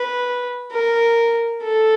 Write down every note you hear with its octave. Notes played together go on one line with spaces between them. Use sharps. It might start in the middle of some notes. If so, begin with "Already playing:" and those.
Already playing: B4
A#4
A4